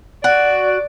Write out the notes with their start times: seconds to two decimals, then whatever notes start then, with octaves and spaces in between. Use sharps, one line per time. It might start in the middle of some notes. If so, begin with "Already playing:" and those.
0.24 F#4 D5